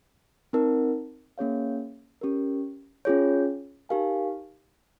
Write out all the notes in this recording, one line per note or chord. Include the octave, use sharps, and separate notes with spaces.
C4 D#4 A#4
A#3 C#4 G#4 C#5 F5
C#4 G4 A#4
C#4 F4 G#4 C#5
D#4 G4 A#4 F5 G#5